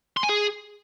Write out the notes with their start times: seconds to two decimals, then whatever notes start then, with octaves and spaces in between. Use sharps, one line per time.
0.17 C6
0.23 G#5
0.29 G#4